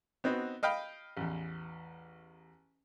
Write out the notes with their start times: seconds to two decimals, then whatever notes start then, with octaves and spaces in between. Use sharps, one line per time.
0.24 B3 C4 D#4 F#4
0.63 D#5 F5 G5 B5
1.17 A1 E2